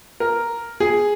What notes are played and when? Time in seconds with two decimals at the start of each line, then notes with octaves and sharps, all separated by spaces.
0.20 A#4
0.80 G#4